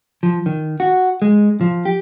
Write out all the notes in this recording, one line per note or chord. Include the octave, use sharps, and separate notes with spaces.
F3
D#3
F#4
G#3
F3
G4